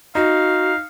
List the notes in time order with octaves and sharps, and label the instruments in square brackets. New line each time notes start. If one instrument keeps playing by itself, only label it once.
[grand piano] D#4 [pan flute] F#4 [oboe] F5